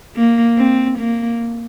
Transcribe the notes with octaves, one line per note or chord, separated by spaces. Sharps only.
A#3
C4
A#3